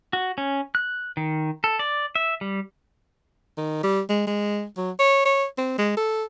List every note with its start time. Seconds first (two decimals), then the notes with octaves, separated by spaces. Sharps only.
0.13 F#4
0.38 C#4
0.75 F#6
1.17 D#3
1.64 A4
1.79 D5
2.16 E5
2.41 G3
3.57 D#3
3.83 G3
4.09 G#3
4.27 G#3
4.77 F#3
4.99 C#5
5.26 C#5
5.58 C4
5.78 G#3
5.97 A4